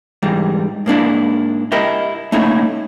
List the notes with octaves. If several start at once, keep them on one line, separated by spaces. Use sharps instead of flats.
G#2 E3 G3
G#2 A#3 D4 E4
E4 G4 A#4 D#5 E5
A3 A#3 C#4 D#4 E4